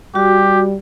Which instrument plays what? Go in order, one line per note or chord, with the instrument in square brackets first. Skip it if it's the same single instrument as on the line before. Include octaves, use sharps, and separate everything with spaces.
[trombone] G3 [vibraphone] F#4 [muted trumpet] G4